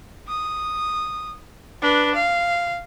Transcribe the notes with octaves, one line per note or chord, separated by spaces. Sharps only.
D#6
D4 B4
F5